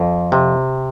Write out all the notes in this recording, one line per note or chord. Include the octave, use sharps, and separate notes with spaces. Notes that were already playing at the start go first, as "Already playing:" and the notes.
Already playing: F2
C3